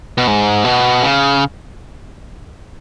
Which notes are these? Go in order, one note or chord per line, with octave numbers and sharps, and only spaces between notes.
B2
G#2
B2
C#3